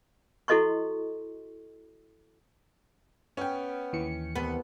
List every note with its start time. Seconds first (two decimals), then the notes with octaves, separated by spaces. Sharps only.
0.48 E4 F#4 A4 D#5 C6 C#6
3.37 B3 C#4 G5
3.93 D#2 E3 C#7
4.35 C2 B3 B4